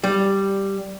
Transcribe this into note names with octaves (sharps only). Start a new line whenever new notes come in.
G3